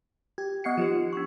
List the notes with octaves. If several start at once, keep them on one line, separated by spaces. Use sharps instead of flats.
G4 G#6
B3 D#5 F#5 C7 C#7
F3 D#4 G4 C5
D4 C#6